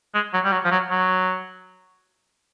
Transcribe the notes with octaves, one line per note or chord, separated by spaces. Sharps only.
G#3
F#3
G3
F#3
F3
F#3
F#3